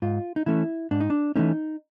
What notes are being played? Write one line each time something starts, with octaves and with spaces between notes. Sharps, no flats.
G#2 F4
D#4
E3 A3 C#4 E4
G#2 D4
D#4
D4
E3 A3 C#4 D#4